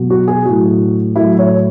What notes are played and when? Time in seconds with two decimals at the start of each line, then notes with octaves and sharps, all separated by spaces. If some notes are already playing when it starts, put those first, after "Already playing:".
Already playing: B2 F#3
0.10 F#4
0.28 G#4
0.45 A2 F#3 F#4
1.16 A2 F#3 E4
1.39 C#5